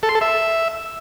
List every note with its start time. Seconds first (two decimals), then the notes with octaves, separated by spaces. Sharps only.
0.03 A4
0.09 C6
0.15 A4
0.21 E5